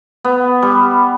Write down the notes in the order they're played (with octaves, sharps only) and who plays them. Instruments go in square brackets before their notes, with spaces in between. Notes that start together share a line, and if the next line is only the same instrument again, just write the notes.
[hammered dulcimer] B3
G3